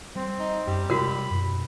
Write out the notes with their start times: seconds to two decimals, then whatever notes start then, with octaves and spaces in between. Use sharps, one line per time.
0.16 G3 C4
0.40 D#4
0.67 F#2 G3
0.90 C3 G#3 F#4 A#4 B5
1.31 F#2 B2